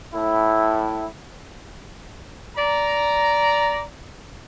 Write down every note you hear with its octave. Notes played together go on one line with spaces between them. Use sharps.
A2 E4
D5 A#5